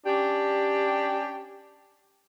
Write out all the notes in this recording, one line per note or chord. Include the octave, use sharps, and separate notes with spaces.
C#4 D4 G4